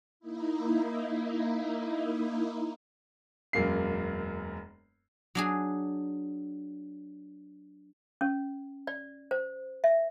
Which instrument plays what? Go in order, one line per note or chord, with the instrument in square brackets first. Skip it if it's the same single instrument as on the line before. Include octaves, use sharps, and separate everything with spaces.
[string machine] A#3 D#4 E4
[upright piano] E1 F#2 A#3 C7
[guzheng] F#3 D4 G#4
[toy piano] C#4
D5
C5
E5